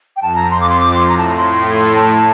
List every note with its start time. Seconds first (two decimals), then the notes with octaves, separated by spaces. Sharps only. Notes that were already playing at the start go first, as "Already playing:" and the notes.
0.17 G5
0.21 F2 A5
0.36 A#5
0.51 F2 C6
0.61 D6
0.69 C6
0.79 F2 D6
0.94 C6
1.08 A2 A#5
1.18 A5
1.28 A#5
1.37 A2 C6
1.95 A5